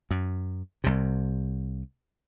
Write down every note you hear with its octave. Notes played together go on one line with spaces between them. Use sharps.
F#2
C2 C3